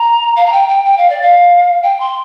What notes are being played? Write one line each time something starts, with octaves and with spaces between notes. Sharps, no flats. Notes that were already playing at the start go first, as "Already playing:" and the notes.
Already playing: A#5
F5
A#5
G5
G5
G5
F5
D5
F5
G5
C6